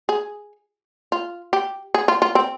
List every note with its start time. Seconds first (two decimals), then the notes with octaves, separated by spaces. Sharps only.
0.09 G#4
1.12 F4
1.53 G4
1.94 G#4
2.08 F4
2.22 F4
2.35 C4